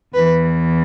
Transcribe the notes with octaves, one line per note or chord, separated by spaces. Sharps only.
E2 E3 B4